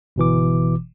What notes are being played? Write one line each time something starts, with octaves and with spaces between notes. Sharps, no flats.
G1 B2 E3 D6